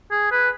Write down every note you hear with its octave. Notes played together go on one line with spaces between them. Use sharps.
G#4
B4